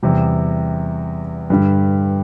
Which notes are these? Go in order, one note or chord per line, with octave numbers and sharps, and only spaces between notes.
E2 C3 G3
G2 D3 G3